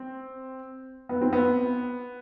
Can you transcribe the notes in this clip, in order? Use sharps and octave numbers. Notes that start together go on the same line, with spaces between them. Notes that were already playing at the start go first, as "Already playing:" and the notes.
Already playing: C4
B3
C4
B3